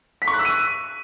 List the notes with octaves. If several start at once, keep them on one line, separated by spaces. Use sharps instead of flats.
B6
C#6
F#6
E6
D#7